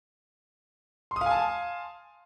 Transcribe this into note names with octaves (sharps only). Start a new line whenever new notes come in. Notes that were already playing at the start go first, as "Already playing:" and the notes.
F5 G#5 A5 C6 D#6